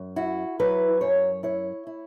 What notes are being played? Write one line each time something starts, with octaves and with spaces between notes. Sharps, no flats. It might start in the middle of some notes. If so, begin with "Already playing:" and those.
Already playing: F#2
E4 F#4
F#3 B4
F#2 C#5
E4 C#5
E4